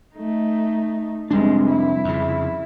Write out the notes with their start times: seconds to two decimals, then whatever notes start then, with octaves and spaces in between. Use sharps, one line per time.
0.15 A3 D#4
1.31 F1 C3 G3 G#3 D4
1.70 E4
2.04 F2 C#3